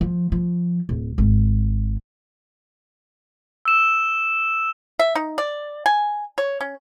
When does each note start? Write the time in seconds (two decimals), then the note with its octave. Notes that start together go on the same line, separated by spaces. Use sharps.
0.01 F3
0.32 F3
0.89 D1
1.18 G#1
3.65 E6 E7
4.99 E5
5.15 D#4
5.38 D5
5.86 G#5
6.38 C#5
6.61 C#4